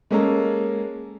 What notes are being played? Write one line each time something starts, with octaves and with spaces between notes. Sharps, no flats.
G#3 A#3 C#4 A4 A#5